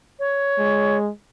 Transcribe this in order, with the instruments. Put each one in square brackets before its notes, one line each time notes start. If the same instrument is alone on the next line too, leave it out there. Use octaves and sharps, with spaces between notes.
[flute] C#5
[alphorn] G#3